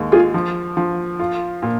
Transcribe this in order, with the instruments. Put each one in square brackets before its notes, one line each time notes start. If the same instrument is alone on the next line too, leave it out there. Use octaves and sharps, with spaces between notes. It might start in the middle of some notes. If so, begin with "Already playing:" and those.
Already playing: [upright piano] D#2 G#3
[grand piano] F4 G#4
[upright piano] F3
F3
F4
A#2